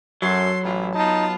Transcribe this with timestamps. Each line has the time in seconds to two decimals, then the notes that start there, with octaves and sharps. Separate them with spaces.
0.22 F#2 F#3 A4 C6
0.64 A1 E4 F4
0.95 B3 D#4 F4 A5